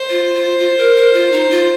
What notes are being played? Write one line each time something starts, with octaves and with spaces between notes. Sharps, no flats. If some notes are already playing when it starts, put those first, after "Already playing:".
Already playing: C5
F4
F4
F4
A#4
A#4
F4
D#4
F4